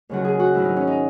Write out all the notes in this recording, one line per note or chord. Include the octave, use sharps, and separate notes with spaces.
D#2 C#3 F#3 F#4
G#4
F#4
G#2 D#3 F#3 E4
D#4
C#4
D#4